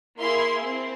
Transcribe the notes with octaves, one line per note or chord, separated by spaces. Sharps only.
A#3 E4 G#4 C6
C4